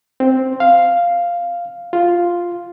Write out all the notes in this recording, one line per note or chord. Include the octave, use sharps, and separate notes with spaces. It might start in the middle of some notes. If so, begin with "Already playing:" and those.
C4
F5
F4